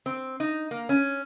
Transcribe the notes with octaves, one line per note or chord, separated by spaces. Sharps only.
C4
D#4
A#3
C#4